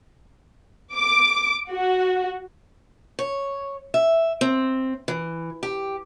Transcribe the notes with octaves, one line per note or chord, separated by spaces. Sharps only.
D6
F#4
C#5
E5
C4
E3
G4